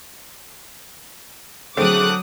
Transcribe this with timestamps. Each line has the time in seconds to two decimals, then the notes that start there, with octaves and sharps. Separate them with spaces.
1.77 D3 F#3 A3 C4 G#4 D6 D#6 F#6